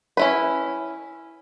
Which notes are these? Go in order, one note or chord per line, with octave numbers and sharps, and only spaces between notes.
C#4 E4 B4